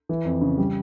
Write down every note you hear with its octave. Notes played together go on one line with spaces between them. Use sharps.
E3
F2
C#3
G3